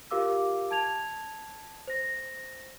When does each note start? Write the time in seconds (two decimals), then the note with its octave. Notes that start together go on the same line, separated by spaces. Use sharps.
0.11 F4 G4 A#4 F5 D6 E6
0.71 A5 G#6 F7
1.87 C5 A#6